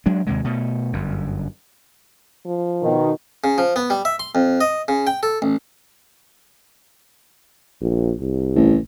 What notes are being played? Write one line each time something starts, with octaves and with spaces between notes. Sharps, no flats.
F#3 G#3 D4
D#2 C3 G#3
B2 A3
G1 F#2
F3
B2 D#3
C#3
F3
B3
G3
E5
C6
F2
D#5
C#3
G5
A4
A1
A#1
C2
A1